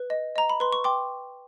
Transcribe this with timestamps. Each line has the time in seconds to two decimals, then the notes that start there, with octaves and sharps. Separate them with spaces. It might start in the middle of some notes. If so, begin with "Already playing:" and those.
Already playing: B4
0.10 D#5
0.36 D#5 A#5
0.50 B5
0.60 B4 C6
0.73 C#6
0.84 G5 C6 D6